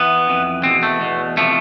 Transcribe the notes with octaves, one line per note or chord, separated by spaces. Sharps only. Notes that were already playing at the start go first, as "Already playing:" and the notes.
Already playing: E3 B3
F2 E3
E2 B2 C4
A3
E2 B2
C3 F3 A3